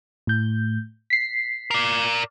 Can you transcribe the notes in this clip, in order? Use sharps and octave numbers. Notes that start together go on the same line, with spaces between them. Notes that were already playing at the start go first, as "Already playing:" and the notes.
A2 G6
B6 C7
A#4 D5